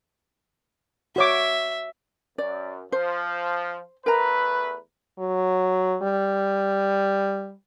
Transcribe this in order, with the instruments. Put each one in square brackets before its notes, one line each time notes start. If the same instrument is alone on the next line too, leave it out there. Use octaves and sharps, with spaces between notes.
[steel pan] F#4 C#5 D6 [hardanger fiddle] E5
[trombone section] F#2 [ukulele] D5
[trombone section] F3 [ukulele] C5
[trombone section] E2 A3 B4 [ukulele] A#4 A#5
[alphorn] F#3
G3